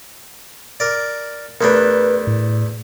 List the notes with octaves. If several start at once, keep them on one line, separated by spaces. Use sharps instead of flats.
A#4 D5
E2 A3 D4 A#4 B4
A2